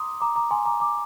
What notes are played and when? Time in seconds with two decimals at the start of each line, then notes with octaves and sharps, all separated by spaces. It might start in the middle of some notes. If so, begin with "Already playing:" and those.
Already playing: A#5 C6 D6 D#6
0.21 A#5 D6
0.36 A#5 D6
0.51 G#5 C6
0.66 A#5 D6
0.80 A#5 D6